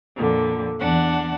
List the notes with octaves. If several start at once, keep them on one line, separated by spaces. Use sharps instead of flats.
F2 A#2 D3
E2 D4 F#5